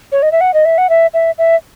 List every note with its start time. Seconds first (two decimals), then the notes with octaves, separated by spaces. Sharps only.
0.12 C#5
0.22 D#5
0.32 E5
0.41 F#5
0.54 D#5
0.65 E5
0.78 F#5
0.89 E5
1.14 E5
1.38 E5